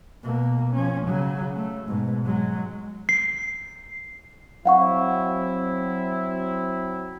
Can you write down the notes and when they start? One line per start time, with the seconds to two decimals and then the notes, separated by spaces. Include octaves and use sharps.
0.23 B2 A#3
0.73 F3 C#4
1.07 C#3 F#3
1.56 A3
1.87 G#2 B2
2.24 F#3 G#3
3.09 C7
4.65 F#3 C4 E4 F5 F#5 C#6